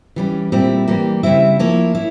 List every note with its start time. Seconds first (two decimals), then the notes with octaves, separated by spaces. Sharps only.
0.16 E3 G3 C#4
0.52 A#2 G3 C4 E4
0.87 E3 G3 A#3
1.23 C#3 G3 C4 E4 E5
1.59 F3 A#3 E4 C#5
1.95 E4